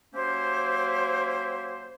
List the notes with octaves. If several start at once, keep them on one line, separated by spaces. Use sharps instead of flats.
F#3 A#3 C#4 E4 G4 C5